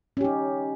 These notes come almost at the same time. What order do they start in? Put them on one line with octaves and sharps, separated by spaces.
C#4 G4 D#4